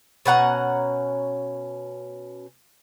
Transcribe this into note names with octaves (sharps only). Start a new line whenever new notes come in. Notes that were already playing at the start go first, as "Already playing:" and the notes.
B2 C#4 F#5 A#5